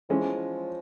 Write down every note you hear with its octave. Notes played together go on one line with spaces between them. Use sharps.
E3 F3 G#3 C#4